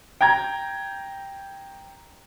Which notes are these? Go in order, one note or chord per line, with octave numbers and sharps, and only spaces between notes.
G5 A#5 G#6